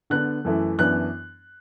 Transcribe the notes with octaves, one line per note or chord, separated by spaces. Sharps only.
D3 B3 D4 F#6
F#2 E3 A3 E4
F#2 E3 B3 D4 F#6